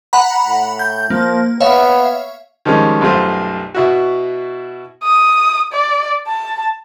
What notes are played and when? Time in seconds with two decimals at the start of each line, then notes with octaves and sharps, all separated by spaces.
0.13 F#5 A#5 B5
0.47 A2
0.79 G6
1.10 F3 A#3
1.60 B3 C#5 E5 F5
2.65 D#3 F3 G3 G#3 C#4
3.01 B1 F#2 G3 A3 F4 C5
3.75 B2 E4 F#4
5.03 D#6
5.73 D5
6.28 A5